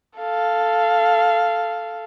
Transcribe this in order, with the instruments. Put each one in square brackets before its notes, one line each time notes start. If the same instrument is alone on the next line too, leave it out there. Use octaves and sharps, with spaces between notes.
[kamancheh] A4 F5